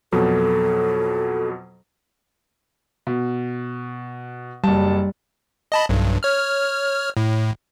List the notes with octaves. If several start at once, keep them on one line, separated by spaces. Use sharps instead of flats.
F2 B2 F#3 A4
B2
F#1 G3 A5
D#5 A5 B5
B1 G2
C#5 F6
A2